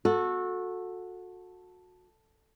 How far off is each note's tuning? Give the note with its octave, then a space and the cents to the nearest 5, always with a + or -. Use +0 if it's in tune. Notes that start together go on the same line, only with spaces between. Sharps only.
F#4 -25 A4 +0